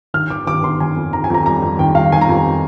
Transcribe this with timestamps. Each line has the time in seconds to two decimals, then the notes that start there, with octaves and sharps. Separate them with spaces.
0.14 D#3 F6
0.30 D#3 D6
0.46 D#3 D6
0.63 D#3 C6
0.80 D#3 G#5
0.96 F2
1.13 D#3 A#5
1.24 G#5
1.30 F2 A#5
1.46 G3 A#5
1.62 F2
1.79 D#3 G5
1.95 G3 F5
2.12 D#3 G#5
2.21 A#5
2.29 F2 G#5